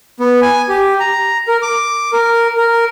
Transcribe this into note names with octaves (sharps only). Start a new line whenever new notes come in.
B3
G#5
G4
A#5
A#4
D6
A#4
A#4